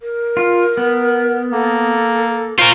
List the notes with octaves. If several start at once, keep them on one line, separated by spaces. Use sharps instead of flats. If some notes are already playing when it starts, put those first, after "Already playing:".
A#4
F4
B3
A#3 A4
F4 A#4 C5 C#6